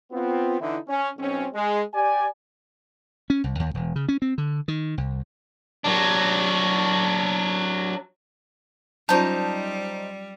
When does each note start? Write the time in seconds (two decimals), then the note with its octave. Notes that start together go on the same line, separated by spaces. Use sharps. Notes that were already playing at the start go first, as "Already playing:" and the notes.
0.12 B3 C4 F4
0.60 D3 E3 D#4 E4
0.88 C#4
1.18 B1 C4 C#4
1.54 G#3
1.93 G4 D5 G#5
3.30 C#4
3.44 C2
3.60 D#2
3.74 E1
3.96 C#3
4.08 C#4
4.22 C4
4.38 D3
4.68 D#3
4.98 C2
5.84 F#3 D4
9.09 F#3 G3 C#4 D#4 F4 C5 A5